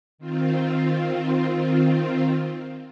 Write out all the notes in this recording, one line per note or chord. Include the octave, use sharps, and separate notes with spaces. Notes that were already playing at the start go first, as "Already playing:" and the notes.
D#3 C4 F4